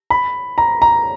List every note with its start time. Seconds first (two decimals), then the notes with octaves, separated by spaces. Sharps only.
0.10 B5
0.58 A#5
0.82 A#5